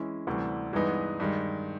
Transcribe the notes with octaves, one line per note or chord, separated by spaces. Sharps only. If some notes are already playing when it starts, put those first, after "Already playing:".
Already playing: E3 G#3 C#4 E4
D2 C3 E3 G3
G2 E3 G#3 B3 D#4
G2 D#3 G#3